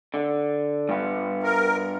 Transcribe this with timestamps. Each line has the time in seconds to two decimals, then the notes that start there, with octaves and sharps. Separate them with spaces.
0.14 D3
0.89 G2 B3
1.43 A#4